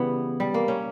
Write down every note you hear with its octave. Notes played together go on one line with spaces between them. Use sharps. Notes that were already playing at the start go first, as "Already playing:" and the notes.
Already playing: C#3 E3 G3 B3
G3
A#3
C#4